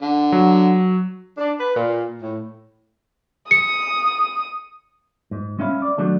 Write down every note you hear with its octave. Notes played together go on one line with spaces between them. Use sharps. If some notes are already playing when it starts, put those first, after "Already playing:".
D3
F#3
D4
B4
A#2
A2
D#6 C#7
G#2
G#3 C#4 E5 F5 B5
D5
D#3 F#3 A3 D4